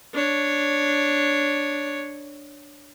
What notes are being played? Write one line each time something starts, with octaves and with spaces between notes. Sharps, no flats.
D4 C#5